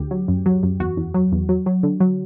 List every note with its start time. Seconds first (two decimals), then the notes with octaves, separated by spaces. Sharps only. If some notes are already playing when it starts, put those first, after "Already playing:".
Already playing: D2 G4
0.11 F#3
0.28 F#2
0.46 F#3
0.63 F#2
0.80 E2 F#4
0.97 E2
1.14 F#3
1.32 E2
1.49 F#3
1.66 F#3
1.83 D3
2.00 F#3